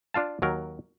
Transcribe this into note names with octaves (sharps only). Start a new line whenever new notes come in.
D4 F4 F5 A5
D#2 F#3 A#4